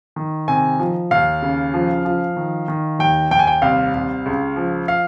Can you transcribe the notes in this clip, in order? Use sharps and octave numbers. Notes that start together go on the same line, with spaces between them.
D#3
C3 G#5
F3
D#2 F5
C#3
F3
F3
D#3
D#3
D#2 G5
D#2 G5
G#5
G5
C2 F5
C2
C#2
F3
F5